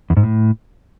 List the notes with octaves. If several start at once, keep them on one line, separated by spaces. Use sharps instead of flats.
E2
G#2
A2